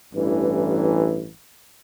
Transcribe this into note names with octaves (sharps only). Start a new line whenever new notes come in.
A1 G2 E3